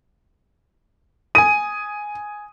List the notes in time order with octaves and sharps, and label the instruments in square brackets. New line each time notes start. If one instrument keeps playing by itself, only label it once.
[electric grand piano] G#5 D#6 [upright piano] D#7